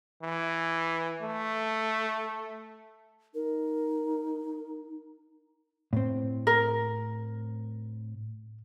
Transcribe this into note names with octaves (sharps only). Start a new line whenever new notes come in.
E3
A3
D#4 A#4
A2 C4
A#4